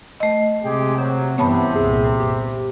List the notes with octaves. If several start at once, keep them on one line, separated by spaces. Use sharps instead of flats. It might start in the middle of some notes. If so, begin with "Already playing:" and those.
A3 D#5
C3 G#3 G4 G#4
F#3 C5
G2 C3 E3 B3 C#5 A5 B5
C2 A#2 G#4
G1 G4